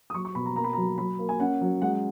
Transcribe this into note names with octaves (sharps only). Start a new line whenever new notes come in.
D#6
F#3 C#6
C#6
B2 B5
A#5
A#3 A#5
B5
A#5
F#3
F#3 B5
A#3
G#5
C#4 F#5
F#3
G#3 F#5